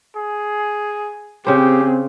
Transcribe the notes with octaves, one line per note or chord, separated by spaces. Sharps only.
G#4
C#3 C4 G4 G#4 C5